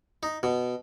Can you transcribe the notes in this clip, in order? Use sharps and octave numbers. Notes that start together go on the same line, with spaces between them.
D#4
B2